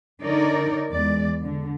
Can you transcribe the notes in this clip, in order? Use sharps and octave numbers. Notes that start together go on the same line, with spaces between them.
D3 D#4 A#4 C#5 D5
E2 G#3 D5
D3